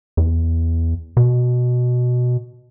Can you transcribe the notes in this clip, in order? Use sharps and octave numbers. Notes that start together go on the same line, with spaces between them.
E2
B2